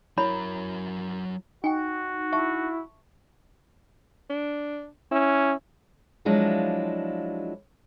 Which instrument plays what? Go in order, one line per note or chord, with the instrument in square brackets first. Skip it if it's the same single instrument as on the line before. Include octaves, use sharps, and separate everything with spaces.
[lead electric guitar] F#3 A#4 [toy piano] E4 C#5 B5
[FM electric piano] D#4 [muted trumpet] F#4 [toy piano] G5 G#5
[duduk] E4 [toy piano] E5 A5 C#6
[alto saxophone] D4
[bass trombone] C#4 [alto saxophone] E4
[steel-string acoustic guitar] F3 F#3 G#3 D4 E4 F4